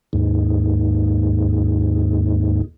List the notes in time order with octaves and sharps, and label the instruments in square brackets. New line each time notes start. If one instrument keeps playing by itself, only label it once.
[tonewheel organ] D#2 G#2